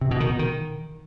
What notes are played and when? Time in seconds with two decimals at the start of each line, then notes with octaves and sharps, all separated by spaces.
0.01 C3
0.11 B2
0.20 D#3
0.30 B2
0.39 D#3